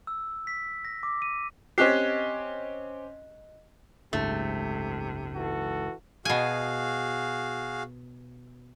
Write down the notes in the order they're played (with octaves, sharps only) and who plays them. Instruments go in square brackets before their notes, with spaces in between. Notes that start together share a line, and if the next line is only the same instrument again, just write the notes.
[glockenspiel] E6
B6
A#6
D6
D#7
[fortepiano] C4 C#4 G4 [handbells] D#5 F#6 C7
[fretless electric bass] F#1 C#2 G#2 [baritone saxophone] C3 [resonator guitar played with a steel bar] A3
[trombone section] E3 F#4 A4
[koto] B2 G#5 [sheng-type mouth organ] F#4 G#4 F5